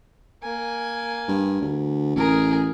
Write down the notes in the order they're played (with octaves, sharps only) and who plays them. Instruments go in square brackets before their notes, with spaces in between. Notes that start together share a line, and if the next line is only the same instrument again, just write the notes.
[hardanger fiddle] A#3 G#5
[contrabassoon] G2
D2
[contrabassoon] A1 [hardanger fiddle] G#4 A#4